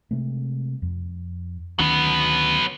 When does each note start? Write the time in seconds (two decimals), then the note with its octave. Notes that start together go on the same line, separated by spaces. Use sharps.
0.11 C3 G#3 A3
0.82 F2
1.79 D2 D#3 F#3 B3 C#4